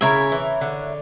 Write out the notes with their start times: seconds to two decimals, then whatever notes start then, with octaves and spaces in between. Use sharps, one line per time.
0.01 C#3 E4 A#4 C#5 E5
0.32 E3
0.61 D3